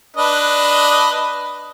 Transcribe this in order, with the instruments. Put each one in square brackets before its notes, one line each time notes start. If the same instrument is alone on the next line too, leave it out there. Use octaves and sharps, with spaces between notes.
[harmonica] D4 B4 D#5